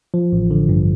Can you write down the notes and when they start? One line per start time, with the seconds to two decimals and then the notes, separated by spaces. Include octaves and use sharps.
0.14 F3
0.32 A1
0.51 D3
0.69 G2